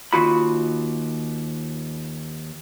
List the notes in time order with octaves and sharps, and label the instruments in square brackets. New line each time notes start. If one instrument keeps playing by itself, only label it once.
[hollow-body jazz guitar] D#2 F4 F#4 B5